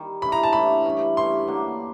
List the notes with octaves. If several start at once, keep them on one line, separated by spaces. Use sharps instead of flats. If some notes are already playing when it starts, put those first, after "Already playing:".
Already playing: D#3 G3
G2 E3 A3 C#4 B5
A#5
A5
G2 E3 A3 C#4 B5
G2 E3 A3 C#4
G2 E3 A3 C#4 C6
D3 F#3 A#3 D4